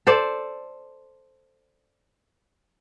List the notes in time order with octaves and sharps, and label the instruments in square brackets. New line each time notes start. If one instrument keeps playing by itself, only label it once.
[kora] A4 C5 D5